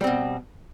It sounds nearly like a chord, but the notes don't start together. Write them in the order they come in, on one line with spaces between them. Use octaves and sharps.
G3 C4 B2